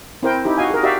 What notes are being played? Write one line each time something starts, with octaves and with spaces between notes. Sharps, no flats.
C4 E4 A#4 C5 G5
D#4 E4 G4
F#4 D#5 F5 G#5
G#4 A#4
F#4 G4 D5 E5 F5